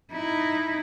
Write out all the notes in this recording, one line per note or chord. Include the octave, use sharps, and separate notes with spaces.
D#4 E4